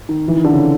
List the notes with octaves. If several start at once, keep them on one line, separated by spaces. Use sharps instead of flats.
D#3
E3
D#3
D3
C#3